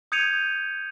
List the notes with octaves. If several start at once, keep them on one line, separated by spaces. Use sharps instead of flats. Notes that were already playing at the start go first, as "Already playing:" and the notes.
D#6 G6 G#6 C#7 D#7 F7